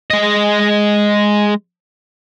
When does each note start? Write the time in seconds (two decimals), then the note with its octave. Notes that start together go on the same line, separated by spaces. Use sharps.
0.11 G#3 D#5